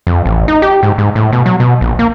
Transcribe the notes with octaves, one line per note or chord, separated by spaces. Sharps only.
F2
A1
D#4
G4
G#2
G#2
A2
B2
F#3
B2
A#1
A#3